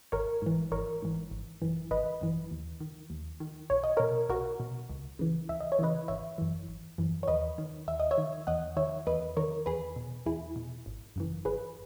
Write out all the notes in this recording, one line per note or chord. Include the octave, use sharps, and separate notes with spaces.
G#1 A#4 C#5
G#2 E3
G#1 A#4 C#5
G#2 E3
G#1
F#2 E3
G#1 B4 D#5
F#2 E3
D#2
D#3
D#2
D#3
B1 C#5
D#5
B2 A#4 C#5
B1 F#4 A#4
B2
C#2
C#3 E3
C#2 E5
D#5
C#5
C#3 E3 B4 D#5
G#1 C#5 E5
F#2 E3
G#1
F#2 E3
C#5
D#2 B4 D#5
D#3
D#2 E5
D#5
C#5 E5
D#3
E2 D#5 F#5
D#3 C#5 E5
E2 B4 D#5
D#3 A#4 C#5
E2 G#4 B4
B2
E2 E4 G#4
B2
G#1
F#2 C#3 E3
G#1 G#4 B4